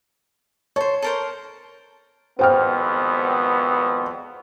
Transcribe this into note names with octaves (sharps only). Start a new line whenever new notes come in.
A4 C5 C#5
A4 A#4 C5
G#1 F2 B3 C5 G5 F6